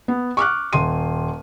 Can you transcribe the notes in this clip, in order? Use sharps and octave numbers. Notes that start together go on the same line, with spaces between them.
B3
C#6 D6 F6 F#6
D#1 C6 D#7